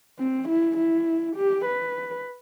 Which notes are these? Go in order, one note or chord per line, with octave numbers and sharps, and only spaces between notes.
C4
E4
E4
G4
B4